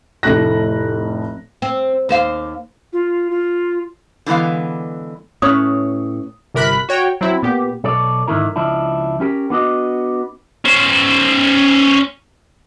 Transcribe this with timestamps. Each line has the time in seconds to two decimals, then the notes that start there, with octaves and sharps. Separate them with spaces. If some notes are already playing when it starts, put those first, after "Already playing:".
0.23 F1 A2 A3 F#6 A#6
1.62 C4
2.09 D#2 C5 F5
2.93 F4
3.31 F4
4.26 D3 E3 G#3 B3 F5
5.42 A2 C#4 B4 C#5 D#6
6.54 G1 C3 A#4 B5 F#6 B6
6.89 F#4 C#5 G5
7.21 F#3 C4 E4
7.42 A#2 B3 G4
7.84 B1 A4 C#5 D5
8.27 G#2 D3 D#3 E4 A#4
8.56 C#2 F3 D4 E4
9.20 C#4 G4 G#4 A#4
9.50 B3 D4 F#4 D#5
10.65 C#4 C5